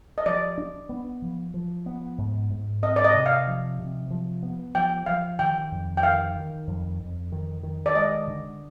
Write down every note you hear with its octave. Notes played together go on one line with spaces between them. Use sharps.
D#5
F3 D5
D4
B3
F3
F3
B3
G#2
G#2
C4 D#5
D5
D#5
C3
F5
F3
C3
F3
B3
F3 G5
F3 F5
D#3 G5
F2
G5
D#3 F5
D#3
F2
F2
D#3
D#3
D5
G#3 D#5
D3